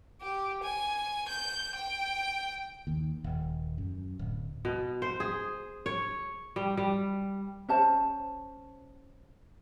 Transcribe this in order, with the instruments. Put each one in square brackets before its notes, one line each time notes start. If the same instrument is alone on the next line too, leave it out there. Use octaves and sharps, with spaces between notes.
[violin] G4
G#5
G6
G5
[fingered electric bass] D#2
D#1
F#2
D1
[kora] B2
C5
G#4
C#5
G3
G3
[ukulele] C#4 C5 A5